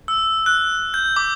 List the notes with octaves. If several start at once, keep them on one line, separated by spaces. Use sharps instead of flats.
E6
F#6
G6
D6